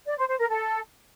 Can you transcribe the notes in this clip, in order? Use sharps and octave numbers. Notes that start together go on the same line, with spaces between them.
D5
C5
C5
A#4
A4